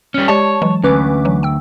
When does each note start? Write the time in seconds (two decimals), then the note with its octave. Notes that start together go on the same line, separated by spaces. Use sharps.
0.14 G3 C#4
0.28 G#3 G4 C#5 D5 A5
0.62 E3 F#3 G#3
0.84 D2 C#4 B4 D6
1.25 E3 F#3
1.43 G5 E6